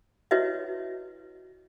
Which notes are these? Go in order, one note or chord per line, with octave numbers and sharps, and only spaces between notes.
E4 F#4 B4 C#5 D#5 E5